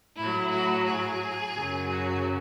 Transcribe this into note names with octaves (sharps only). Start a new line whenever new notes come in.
A2 F#3 E4
F#4
G#4
F#2 C#3 F#3
F#4